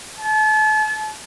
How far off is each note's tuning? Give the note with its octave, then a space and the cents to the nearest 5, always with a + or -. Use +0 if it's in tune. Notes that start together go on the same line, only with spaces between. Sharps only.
A5 -35